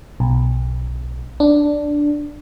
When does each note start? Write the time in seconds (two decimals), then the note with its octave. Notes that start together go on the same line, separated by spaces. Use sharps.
0.20 B1
1.40 D4